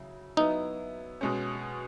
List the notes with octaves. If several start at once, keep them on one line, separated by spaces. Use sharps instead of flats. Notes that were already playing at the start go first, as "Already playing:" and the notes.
Already playing: C#3 F#3 E4
F#3 B3 D#4 E4
B2 G#3 C#4